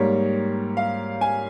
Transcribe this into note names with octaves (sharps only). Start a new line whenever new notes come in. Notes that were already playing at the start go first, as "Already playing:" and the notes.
Already playing: G#2 G3 A#3 C#5
F5
G#5